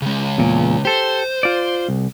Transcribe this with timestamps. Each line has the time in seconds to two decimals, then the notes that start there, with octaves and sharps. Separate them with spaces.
0.02 C#3 G#3
0.38 E2 A#2
0.85 G4 A4 C5
1.43 F4 D5
1.88 C2